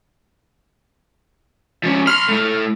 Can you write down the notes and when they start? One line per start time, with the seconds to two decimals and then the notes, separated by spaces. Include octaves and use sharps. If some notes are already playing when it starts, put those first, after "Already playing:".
1.84 F3 C#4
2.07 B5 C6 F6
2.29 A2 A3